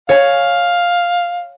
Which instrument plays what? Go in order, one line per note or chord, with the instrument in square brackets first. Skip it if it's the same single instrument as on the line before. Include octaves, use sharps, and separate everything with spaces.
[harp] C#5 G#5 [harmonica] F5